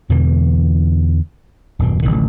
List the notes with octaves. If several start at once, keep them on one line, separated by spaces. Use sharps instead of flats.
E2 B2 D3 E3
D#1 F#2 B2
D1 A1 C3 D#3